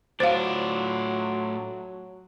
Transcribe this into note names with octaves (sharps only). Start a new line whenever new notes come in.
A2 F#3 D4 F4 C5 F5